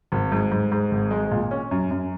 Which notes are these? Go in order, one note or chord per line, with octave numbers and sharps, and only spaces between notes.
G#1
G#2
G#2
G#2
G#1
G#3
A#2
C#4
F#2
F#2